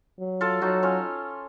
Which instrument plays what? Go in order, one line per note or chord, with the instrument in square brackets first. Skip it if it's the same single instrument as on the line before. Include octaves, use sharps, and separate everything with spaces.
[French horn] F#3
[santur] F4 A4
[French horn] F#3 [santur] D#4 F#4
[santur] C#4 F4